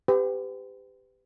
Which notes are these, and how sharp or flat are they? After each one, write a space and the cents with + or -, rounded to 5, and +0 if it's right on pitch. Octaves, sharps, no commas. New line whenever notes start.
G4 +15 B4 +40